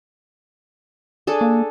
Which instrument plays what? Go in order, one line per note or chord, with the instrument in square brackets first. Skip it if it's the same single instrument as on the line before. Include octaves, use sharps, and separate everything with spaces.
[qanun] D4 G#4 A4
[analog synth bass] A#3